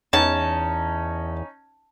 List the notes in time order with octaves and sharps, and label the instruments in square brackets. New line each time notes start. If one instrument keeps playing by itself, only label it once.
[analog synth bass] E2 [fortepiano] C#4 D#4 [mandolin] A5